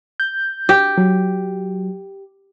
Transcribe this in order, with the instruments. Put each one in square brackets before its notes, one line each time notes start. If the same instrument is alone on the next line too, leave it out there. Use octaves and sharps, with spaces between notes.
[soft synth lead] G6
[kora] G4
[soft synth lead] F#3